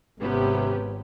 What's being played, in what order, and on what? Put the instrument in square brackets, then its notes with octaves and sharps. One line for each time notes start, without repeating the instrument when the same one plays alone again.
[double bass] G#1 [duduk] C3 [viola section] B3 C#4 G4